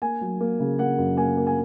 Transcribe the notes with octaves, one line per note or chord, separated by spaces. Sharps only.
A#3 G#5
F#3
A#3
C#3
A#3 F#5
F#2
A#3 G#5
A#3
G#5